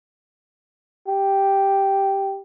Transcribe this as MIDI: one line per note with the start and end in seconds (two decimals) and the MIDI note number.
1.08 2.41 67